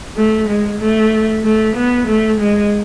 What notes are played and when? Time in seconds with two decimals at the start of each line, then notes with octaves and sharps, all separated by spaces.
0.17 A3
0.49 G#3
0.81 A3
1.44 A3
1.76 B3
2.07 A3
2.39 G#3